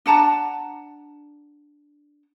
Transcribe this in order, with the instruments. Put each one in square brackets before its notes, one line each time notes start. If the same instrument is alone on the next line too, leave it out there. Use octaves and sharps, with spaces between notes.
[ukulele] D4 F#5 A5 A#5